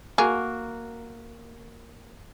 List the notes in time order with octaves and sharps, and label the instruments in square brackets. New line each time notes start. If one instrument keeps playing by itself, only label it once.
[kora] A#3 F#4 [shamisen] G#4